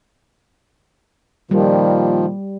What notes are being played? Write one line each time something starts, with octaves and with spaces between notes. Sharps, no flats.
A#2 D#3 F3 G3